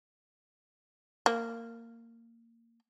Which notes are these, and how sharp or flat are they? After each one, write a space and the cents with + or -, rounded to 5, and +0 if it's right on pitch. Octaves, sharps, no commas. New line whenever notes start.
A#3 -15